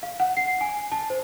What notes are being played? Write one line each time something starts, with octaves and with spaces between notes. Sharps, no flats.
F5
F#5
C7
G#5
A5
C5